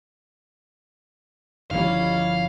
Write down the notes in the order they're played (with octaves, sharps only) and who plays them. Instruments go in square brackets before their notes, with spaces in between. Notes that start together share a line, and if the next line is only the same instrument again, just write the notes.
[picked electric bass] G1 F3 [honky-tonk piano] D#3 G3 [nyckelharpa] C#4 E4 [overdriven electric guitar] F5